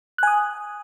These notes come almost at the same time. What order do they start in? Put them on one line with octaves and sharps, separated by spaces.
F#6 G#5 D#6